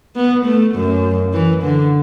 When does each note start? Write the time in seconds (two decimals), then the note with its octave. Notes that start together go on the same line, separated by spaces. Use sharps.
0.16 B3
0.46 A3
0.75 F#2
1.33 E3
1.63 D3